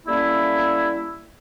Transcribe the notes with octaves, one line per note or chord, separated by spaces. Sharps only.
G3 A3 A#3 C#4 E4